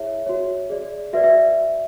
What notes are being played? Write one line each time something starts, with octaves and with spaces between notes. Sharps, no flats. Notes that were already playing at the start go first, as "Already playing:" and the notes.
Already playing: E4 G#4 C#5 E5
F#4 C#5
G#4 D5
F#4 B4 D5 E5
E5